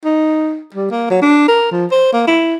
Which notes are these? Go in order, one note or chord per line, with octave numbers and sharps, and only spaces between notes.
D#4
G3
A#3
F#3
D4
A#4
F3
C5
A#3
E4